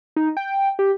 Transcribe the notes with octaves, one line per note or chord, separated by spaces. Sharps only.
D#4
G5
G4